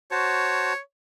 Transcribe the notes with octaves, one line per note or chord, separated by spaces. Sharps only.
F#4 C5 C#5 A5